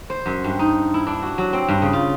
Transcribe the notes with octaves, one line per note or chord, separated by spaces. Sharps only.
C5
F#2
G2
D#4
E4
D4
F#4
F#3
C4
G2
C#3
F4